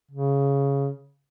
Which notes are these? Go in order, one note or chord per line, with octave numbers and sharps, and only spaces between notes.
C#3